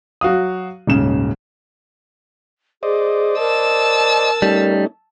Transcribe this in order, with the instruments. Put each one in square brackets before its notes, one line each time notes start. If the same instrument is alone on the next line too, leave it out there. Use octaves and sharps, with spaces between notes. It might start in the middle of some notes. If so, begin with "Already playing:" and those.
[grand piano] F#3 F#4 F5 D#6
D#1 G#2 C#3 E7
[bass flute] G#4 [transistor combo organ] C5 D5 D#5
[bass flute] A#4 [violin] A5 E6
[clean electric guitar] G3 [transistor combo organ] A3 C#4 D#4